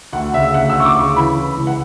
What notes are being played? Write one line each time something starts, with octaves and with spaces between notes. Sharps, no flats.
D2 F#5
C#3 E5
D2 F#5
E6
D2 C#6
D6
C#3
C#6
E3 B5
E3
C#2
F#5